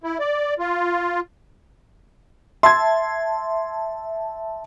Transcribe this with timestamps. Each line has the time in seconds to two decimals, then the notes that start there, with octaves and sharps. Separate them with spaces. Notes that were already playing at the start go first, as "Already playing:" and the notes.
0.04 E4
0.19 D5
0.59 F4
2.63 E5 A5 C6 G#6